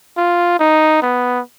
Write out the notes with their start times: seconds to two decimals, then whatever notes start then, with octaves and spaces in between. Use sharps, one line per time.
0.17 F4
0.59 D#4
1.02 B3